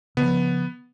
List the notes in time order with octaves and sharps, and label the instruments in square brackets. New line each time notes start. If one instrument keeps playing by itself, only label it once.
[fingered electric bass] C#3 F3 [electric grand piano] B3